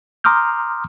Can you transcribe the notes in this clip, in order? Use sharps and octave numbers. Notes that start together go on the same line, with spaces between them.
A#5 C6 D6 D#6 F6 G6